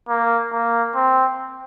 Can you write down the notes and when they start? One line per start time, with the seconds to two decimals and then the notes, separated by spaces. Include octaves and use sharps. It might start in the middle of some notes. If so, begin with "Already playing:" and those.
0.08 A#3
0.52 A#3
0.95 C4